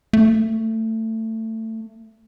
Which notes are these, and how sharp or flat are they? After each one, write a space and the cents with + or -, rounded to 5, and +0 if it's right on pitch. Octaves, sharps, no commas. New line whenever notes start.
A3 +20